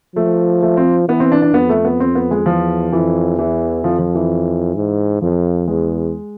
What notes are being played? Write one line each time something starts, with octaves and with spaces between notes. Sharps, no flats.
F3 A3
A3
C4
E3 B3
C4
D4
D4
F2 B3
A3
B3
C4
B3
G#3
E2 F3
F2 E3
E2 E3
F2 F3
F3
E3
G#2
F2 F3
E2 G#3